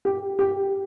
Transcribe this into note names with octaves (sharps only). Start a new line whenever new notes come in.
G4
G4